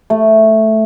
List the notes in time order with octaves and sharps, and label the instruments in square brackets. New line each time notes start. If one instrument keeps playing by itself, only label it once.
[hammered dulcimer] A3